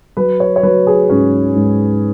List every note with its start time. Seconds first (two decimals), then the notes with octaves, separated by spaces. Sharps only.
0.17 F#3 B4
0.40 C#5
0.56 C#5
0.63 F#3 B4
0.87 G#4
1.09 G#2 C#4
1.56 G#2